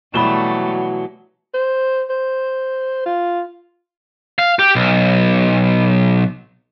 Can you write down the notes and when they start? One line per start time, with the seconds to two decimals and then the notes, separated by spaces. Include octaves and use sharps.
0.14 B2 E3 F#3 G3 A3 B5 E7 G7
1.54 C5
2.10 C5
3.06 F4
4.39 F5
4.59 G4
4.75 B1